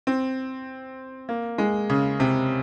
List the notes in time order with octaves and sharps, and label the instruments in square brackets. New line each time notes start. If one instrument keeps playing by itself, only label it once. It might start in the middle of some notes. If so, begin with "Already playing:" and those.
[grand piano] C4
A#3
G#3
C#3
C3